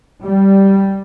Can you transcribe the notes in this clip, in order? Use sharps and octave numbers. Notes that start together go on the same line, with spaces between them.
G3